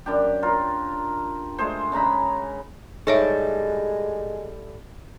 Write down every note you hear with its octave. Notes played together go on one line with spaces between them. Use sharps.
F#2 D4 G4
F4 A#4
G#3 A3 G#4 C5
C#3 G#3 A#5 B5
A2 G3 G#3 D#4 A4 C#5 E5